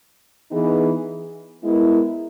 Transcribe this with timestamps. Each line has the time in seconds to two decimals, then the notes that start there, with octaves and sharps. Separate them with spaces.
0.51 E3 B3 D#4 G#4
1.62 G#3 B3 E4 A#4